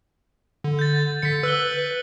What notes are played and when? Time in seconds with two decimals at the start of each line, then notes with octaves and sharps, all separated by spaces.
0.64 D3
0.79 G6 A6
1.22 D3 B6 C#7
1.43 B4 E6 F#6 G7